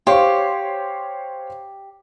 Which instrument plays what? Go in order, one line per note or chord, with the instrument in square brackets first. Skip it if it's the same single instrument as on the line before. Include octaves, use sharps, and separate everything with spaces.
[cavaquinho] G4 [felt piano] C5 C#5 C6 [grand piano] F5 C#6